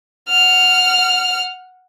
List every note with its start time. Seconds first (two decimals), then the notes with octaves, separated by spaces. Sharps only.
0.29 F#5 F6